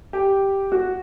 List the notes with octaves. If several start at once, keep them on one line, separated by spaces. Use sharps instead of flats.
G4
F#4